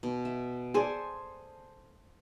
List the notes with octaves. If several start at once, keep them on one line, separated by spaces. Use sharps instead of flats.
B2
E5
G#4 A4 C5 D5 G#5